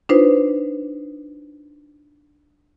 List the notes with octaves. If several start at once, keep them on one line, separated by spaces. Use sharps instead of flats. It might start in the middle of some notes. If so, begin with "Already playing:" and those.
D4 D#4 F4 B4 C5